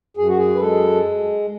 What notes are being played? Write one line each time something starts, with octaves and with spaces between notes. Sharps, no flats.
F#2 G#4
F#4
G#4
B4
G#3 A4